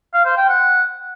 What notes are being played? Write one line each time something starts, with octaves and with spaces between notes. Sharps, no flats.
F5
C5
G5
F#5